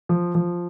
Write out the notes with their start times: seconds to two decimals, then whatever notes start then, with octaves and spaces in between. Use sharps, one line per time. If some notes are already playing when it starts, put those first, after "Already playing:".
0.09 F3
0.35 F3